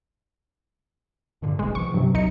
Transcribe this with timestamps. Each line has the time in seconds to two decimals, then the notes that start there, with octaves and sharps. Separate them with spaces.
1.42 G2 A#2 D3
1.59 F#1 B1 G#3
1.75 B2 F3 C#6
1.94 G2 C3 F#3
2.14 C2 D#4 C#7